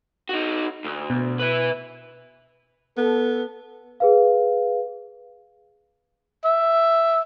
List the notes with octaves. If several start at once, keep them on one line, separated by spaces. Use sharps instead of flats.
D#4 F#4
D2
B2
B4 E5
B3 A4
G#4 B4 F5
E5